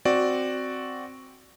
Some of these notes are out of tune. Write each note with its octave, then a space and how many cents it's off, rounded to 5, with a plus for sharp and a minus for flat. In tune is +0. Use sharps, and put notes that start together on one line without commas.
C4 +0 F#4 +0 D5 +0